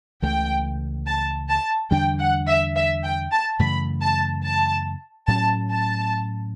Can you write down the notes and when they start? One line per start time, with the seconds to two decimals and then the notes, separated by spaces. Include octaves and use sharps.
0.22 C#2 C#3 E3 A3 G5
1.06 A5
1.50 A5
1.91 E2 D3 G3 D4 G5
2.19 F#5
2.47 E5
2.75 E5
3.03 G5
3.32 A5
3.59 F#2 C#3 E3 A3 B5
4.02 A5
4.44 A5
5.28 A2 F#3 C#4 A5
5.70 A5